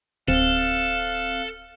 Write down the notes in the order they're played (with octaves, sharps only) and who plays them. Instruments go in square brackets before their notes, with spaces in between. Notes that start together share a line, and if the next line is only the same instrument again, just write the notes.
[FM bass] D1 [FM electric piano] C4 [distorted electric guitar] A4 [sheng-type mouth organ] F5 F#6